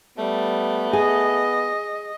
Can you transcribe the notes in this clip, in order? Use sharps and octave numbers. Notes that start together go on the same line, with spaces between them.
G3 A3 B3
G#4 D#5